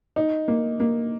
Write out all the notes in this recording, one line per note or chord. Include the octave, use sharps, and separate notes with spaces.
D#4
A#3
A#3